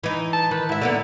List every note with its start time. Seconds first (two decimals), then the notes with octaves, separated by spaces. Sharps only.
0.03 E3 D#4
0.33 A5
0.51 D#3 B4
0.69 G#2 E4 E5
0.81 D3 A#3 B3